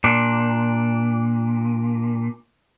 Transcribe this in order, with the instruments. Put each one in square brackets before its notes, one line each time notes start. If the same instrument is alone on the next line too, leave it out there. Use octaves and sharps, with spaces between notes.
[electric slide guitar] A#2 D4